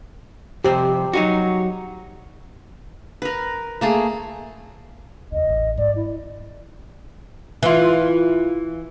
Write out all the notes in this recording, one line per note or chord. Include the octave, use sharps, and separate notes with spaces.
F2 C3 C4 G4
F#3 D#4 F#4
A#4 B4
A3 A#3 G#4
E2 C#3 D#5
A1
G#2 D5
E4
E3 F4